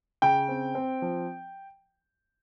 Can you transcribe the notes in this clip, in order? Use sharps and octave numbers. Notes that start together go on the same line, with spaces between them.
C#3 G5
C4
C4
F3